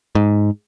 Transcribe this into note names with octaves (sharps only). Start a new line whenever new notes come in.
G#2